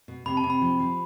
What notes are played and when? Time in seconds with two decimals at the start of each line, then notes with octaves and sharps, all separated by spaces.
0.08 B2
0.26 C3 B5
0.37 A5
0.44 C3
0.50 B5
0.62 F3
0.79 F3